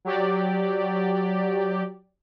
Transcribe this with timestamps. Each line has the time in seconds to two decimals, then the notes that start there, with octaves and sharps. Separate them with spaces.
0.05 F#3 G4 D5